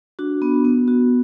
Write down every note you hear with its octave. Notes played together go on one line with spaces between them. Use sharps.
D4 F#4
B3
B3
F#4